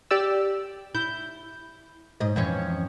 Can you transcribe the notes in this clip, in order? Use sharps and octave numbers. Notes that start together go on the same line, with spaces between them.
G4 D5 E6
E4 G6
G#2 D#5
F2 E3 C#4